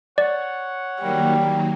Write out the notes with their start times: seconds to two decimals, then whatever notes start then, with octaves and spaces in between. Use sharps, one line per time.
0.18 C#5 D5 F#5
1.01 D#3 F#3 G3 A#3